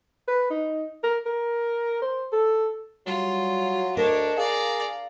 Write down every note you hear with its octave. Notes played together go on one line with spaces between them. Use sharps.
B4
D#4
A#4
A#4
C5
A4
F#3 G3 F4
D2 D4 A#4 C#5 D#5
G#4 D5 F5 A#5